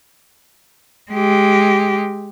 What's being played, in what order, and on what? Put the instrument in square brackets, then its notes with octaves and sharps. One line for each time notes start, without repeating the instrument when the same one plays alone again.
[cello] G#3 G4